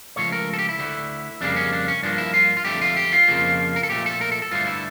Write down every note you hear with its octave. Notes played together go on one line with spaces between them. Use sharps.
C#2 C#3 F3 A3 C#5
A#4
A4
G4
E4
D2 D3 A3
F2 C#3 G3 A#3 D4
C#4
D4
C#4
G2 F3 A#3 D4
E4
F4
F4
F2 D3 A3 G4
F4
G4
F4
F2 C#3 F3 A#3
A#4
A4
A#2 F3 A3 G4
A4
A#4
A4
A4
G2 D3 A3 F4
E4